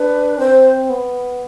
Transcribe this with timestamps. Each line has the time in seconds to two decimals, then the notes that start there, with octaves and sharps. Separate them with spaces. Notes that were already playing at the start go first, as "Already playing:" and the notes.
Already playing: D4 B4
0.38 C4 C5
0.90 B3